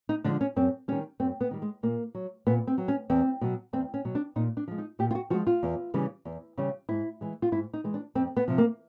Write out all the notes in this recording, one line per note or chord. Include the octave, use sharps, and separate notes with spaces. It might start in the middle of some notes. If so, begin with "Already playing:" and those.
D#4
D3 F3 G#3 D4
C#4
F#2 C4
D#3 G3 C#4
F#2 C4
B3
D#3 G3
G#3
A#2 A#3
F#3
A#2 B3
C4
F#3
C#4
E2 C4
B2 F#3
E2 C4
C#4
B2 F#3
D4
A#2 D#4
D4
F3 G#3
D#4
A#2 G4
F4
F#4
F3 G#3 F#4
F4
E2
C#3 E3 G3
E2
C#3 E3 G3
G#2 E4
E3 G#3
F4
G#2 E4
D#4
E3 G#3
D4
F2 C4
B3
C3 F3
A#3